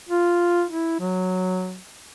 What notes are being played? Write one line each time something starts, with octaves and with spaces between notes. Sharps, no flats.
F4
E4
F#3